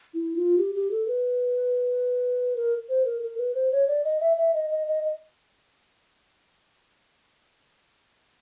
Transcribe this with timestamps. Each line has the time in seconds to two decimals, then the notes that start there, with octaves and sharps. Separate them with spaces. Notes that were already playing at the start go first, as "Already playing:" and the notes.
0.14 E4
0.36 F4
0.58 G4
0.75 G4
0.91 A4
1.08 B4
2.56 A#4
2.89 C5
3.05 A#4
3.22 A#4
3.38 B4
3.55 C5
3.72 C#5
3.88 D5
4.04 D#5
4.21 E5
4.37 E5
4.54 D#5
4.70 D#5
4.87 D#5
5.04 D#5